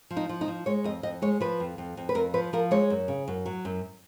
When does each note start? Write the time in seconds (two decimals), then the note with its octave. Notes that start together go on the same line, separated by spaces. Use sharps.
0.11 F3
0.17 D#4
0.29 F3
0.41 D#4
0.48 F3
0.66 G#3 C#5
0.84 F2 D#5
1.03 F2 D#5
1.22 G#3 C#5
1.41 F3 B4
1.60 F2
1.78 F2
1.97 F2
2.09 B4
2.15 F2 A#4
2.34 F3 B4
2.53 F3 A#4
2.71 G#3 C#5
2.90 F#2
3.08 C#3
3.28 F#2
3.46 F#3
3.65 F#2